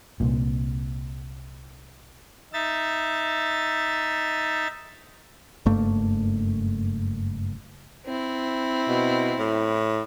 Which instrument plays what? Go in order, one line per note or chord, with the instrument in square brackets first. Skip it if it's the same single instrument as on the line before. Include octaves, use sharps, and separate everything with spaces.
[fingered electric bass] C2 A#2
[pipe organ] D#4 E5 A6
[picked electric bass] F#1 G2 A3 A#3
[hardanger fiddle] C4 E4
[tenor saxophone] B2
A2